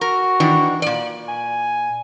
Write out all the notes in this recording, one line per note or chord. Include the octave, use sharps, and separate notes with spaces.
F#4 A#4
D#3 E3 D4
A#2 D5
G#5